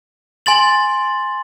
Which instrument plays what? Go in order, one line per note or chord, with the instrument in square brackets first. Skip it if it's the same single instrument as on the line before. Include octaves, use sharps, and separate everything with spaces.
[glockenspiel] G#5 C6 A6 F#7